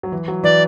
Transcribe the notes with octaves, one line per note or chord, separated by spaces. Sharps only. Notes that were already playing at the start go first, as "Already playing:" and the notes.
F#3
E3
F#3
E3 D5